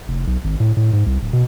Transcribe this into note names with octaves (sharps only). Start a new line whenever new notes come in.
F1
B1
G#1
A2
A2
G#2
C2
D1
B2